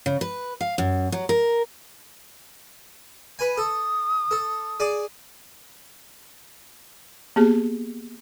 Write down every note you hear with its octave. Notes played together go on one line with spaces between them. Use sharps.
C#3
B4
F5
F#2
F#3
A#4
B4 G#5
A4 D#6
A4
G#4 D5
A#3 B3 G4 G#4